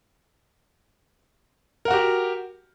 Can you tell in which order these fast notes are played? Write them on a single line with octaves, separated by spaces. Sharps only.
A#4 F#5 F#4 G4